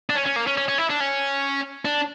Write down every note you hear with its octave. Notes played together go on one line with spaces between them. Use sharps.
D4
C#4
C#4
A#3
C#4
C#4
C#4
E4
D4
C#4
D4